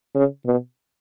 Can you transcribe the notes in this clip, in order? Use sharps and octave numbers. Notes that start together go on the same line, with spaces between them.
C#3
B2